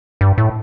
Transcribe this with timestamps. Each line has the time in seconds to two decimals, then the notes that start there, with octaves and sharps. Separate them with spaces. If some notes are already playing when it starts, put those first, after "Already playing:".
0.21 G2
0.38 A2